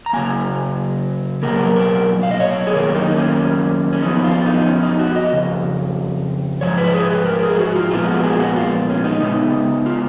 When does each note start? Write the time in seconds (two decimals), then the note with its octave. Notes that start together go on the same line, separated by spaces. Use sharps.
0.06 A#5
0.13 C#3 F#3 A#3 G#5
1.43 B2 F#3 A#3 A#4
1.76 A#4
2.23 F5
2.31 D#5
2.40 C#5
2.67 G#4
2.73 F#2 D#3 A#3 A#4
2.94 D#4
3.10 D#4
3.16 C#4
3.93 C#4
4.02 F2 F3 B3 D#4
4.24 F4
4.46 D#4
4.67 C#4
4.83 D#4
4.99 F#4
5.16 D#5
5.33 F2 C#3
6.61 G#2 F3 C#5
6.78 B4
6.94 G#4
7.10 B4
7.26 A#4
7.43 G#4
7.59 F#4
7.75 F4
7.91 A#2 F3 G#3 B3 F4
8.07 F#4
8.24 G#4
8.40 F#4
8.56 F4
8.89 C#4
9.04 D#4
9.21 C#3 G#3 B3 D#4
9.86 F4